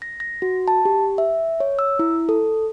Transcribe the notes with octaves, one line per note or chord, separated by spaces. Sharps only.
A#6
A#6
F#4
A5
G4
E5
C#5
E6
E4
A4